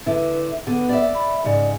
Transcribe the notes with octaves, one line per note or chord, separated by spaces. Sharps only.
D3 E4 B4
D3 B3
D5 E5
B5
G#2 C#3 D5